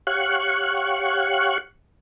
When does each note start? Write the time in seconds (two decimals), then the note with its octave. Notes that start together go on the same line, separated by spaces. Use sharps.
0.07 G4 C#5 F5 F#5 C#6 F#6